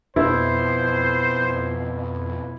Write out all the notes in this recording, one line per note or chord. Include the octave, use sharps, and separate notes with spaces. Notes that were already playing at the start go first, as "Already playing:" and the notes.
F2 B2 E4 C5